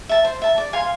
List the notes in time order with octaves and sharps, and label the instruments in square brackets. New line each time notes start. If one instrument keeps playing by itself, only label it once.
[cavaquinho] E5 A5
C5
E5 A5
D5
F5 G#5 C6